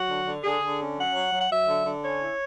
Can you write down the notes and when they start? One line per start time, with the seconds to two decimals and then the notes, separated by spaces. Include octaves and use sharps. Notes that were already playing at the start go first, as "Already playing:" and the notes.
Already playing: F#3 F#4
0.09 D3
0.26 D3
0.44 D3 G#4
0.63 D3
0.80 C#4
0.97 F#3 F#5
1.14 F#3
1.33 F#3
1.40 F#5
1.51 F#3 E5
1.68 D3
1.86 D3
2.03 C#4 C#5
2.21 E4